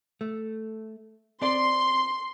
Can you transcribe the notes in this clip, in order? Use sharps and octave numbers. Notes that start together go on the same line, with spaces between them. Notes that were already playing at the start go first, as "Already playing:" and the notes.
A3
C4 D5 C6